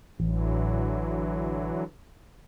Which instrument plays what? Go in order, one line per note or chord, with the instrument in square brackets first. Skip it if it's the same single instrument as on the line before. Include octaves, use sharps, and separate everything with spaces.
[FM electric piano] A1 [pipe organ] D3 E3 F#3